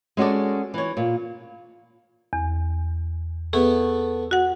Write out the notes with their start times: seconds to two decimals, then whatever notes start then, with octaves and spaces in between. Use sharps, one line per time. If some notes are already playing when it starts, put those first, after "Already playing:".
0.17 G#3 C#4 F#4 A4 D5
0.74 E3 C#5
0.97 A#2
2.33 E2
3.53 A3 B3 G#4
4.31 F#4 F#5